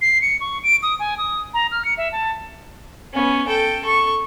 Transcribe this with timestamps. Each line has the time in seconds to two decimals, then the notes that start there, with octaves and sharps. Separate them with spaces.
0.01 C7
0.22 C#7
0.41 C#6
0.63 D7
0.83 D#6
1.00 G#5
1.18 D#6
1.54 A#5
1.71 F6
1.85 C#7
1.98 E5
2.12 A5
3.13 B3 C#4
3.48 A4 G5
3.83 A4 C#6